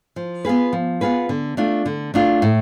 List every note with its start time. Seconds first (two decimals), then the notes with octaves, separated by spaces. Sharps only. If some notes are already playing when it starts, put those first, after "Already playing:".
0.16 F3
0.45 B3 F4 G#4 B4
0.73 F3
1.01 B3 F4 G#4 B4
1.29 D3
1.57 A3 D4 F4
1.85 D3
2.14 A3 D4 F4
2.42 A2